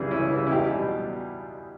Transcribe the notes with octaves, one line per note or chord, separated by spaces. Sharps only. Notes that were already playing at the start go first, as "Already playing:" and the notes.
Already playing: C#2 C#3 E3 G3 E4 G#4
C#2 C#4 E4
C#3 E3 G3
E4
E2 D#4 G4
B2 G3